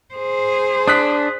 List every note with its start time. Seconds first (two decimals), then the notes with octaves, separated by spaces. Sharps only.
0.14 G#4 C5
0.88 D4 D#6 F#6 B6